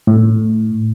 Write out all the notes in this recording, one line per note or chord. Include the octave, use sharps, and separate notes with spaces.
A2